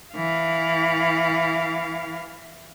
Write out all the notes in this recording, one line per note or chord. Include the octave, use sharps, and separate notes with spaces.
E3 F5